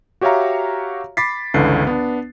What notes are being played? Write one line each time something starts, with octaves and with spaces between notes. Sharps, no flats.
F#4 G4 C#5 E5 F5 A#5
B5 D6 A6 B6 C7
G1 C#2 D3 E3 B4 C7
B3 D4